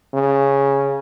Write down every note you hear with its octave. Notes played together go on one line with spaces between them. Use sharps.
C#3